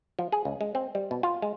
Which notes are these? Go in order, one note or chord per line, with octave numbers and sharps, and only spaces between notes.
F3
G#4
C#2
G#3
C4
G3
B2
F4
G#3